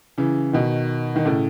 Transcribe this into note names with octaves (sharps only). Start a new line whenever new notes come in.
C#3 E3
B2 D#3
D#3
A2 C#3